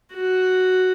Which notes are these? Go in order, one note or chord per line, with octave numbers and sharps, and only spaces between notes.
F#4